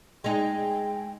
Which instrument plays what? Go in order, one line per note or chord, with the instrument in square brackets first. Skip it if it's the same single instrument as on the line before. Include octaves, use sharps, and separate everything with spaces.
[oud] G#3 D#4 [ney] G5